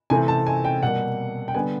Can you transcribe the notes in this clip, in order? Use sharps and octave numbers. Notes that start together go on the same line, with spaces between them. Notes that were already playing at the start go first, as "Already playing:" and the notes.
C3 E3 A3 C4 G#5
A5
G#5
G5
B2 G3 A#3 F#5
G5
D3 G3 B3 G#5